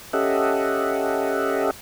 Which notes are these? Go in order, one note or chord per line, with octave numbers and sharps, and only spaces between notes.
C#4 G4 A4 D#5 E5 F#5